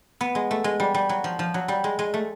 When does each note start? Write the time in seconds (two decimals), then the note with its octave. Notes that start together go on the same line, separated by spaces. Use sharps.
0.21 B3
0.35 G#3
0.51 A3
0.64 G#3
0.80 G3
0.94 G3
1.09 F#3
1.24 F3
1.39 F3
1.54 F#3
1.68 G3
1.84 G#3
1.99 G#3
2.14 A3